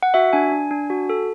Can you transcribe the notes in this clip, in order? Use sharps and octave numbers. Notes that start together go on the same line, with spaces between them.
F#5
F#4 E5
D4 G#5
D4
D4
F#4
A4